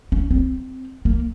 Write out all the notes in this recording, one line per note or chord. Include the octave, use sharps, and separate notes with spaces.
C#4
C4
A#3